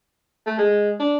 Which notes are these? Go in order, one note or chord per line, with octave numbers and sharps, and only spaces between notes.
A3
G#3
D4